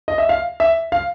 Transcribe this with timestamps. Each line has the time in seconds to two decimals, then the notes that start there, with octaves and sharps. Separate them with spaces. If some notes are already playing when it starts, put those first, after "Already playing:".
0.08 D#5
0.18 E5
0.29 F5
0.60 E5
0.92 F5